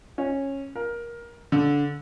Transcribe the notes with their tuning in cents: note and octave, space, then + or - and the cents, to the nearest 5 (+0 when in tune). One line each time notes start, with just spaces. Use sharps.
C#4 -15
A#4 +15
D3 -20